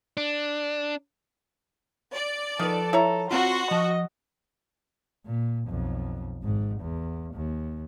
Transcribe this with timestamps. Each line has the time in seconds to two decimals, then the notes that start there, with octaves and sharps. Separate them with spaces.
0.17 D4
2.14 D5
2.59 D#3 F3 A4 B4
2.93 E4 C#5 A#5
3.31 C4 F4 F#4 C6
3.71 F3 D#5 A5
5.25 A#2
5.68 B1 F2
6.43 G#1 G#2
6.80 E2
7.34 D#2